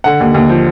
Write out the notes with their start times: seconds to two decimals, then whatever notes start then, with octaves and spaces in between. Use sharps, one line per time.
0.04 D3 F#5
0.20 D#2
0.34 D#2
0.49 F3